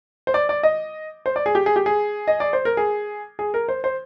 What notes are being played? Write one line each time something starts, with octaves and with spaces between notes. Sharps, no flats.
C5
D5
D5
D#5
C5
D5
G#4
G4
G#4
G4
G#4
D#5
D5
C5
A#4
G#4
G#4
A#4
C5
C5